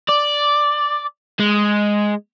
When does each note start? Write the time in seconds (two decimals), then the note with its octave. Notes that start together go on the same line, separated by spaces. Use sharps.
0.08 D5
1.40 G#3